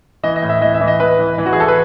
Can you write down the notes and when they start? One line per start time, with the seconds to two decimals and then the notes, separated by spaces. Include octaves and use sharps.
0.23 E3 D#5
0.36 D#5
0.42 A2
0.49 E5
0.61 E3 D#5
0.74 E5
0.81 E3
0.87 D#5
1.00 E3 B4
1.19 E3
1.38 E3
1.46 F#4
1.53 G#4
1.56 E3 A4
1.68 B4